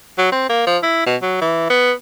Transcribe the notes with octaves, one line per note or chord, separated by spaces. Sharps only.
F#3
C4
A#3
F3
E4
B2
F#3
E3
B3